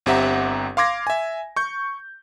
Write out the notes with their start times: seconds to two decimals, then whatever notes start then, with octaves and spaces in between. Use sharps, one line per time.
0.06 G1 C4 G4 E5 F#5 A#5
0.77 F5 C6 D6 G#6 A#6
1.07 E5 G#5
1.56 C#6 G6